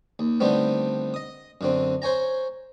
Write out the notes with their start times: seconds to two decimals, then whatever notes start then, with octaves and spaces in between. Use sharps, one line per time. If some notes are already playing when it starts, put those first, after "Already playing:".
0.19 D#2
0.40 D3 D#3 G3 A3 B3 C4
1.14 D#5 D#6
1.61 F#2 D3 C4
2.02 C5 C#5 G#5 A#5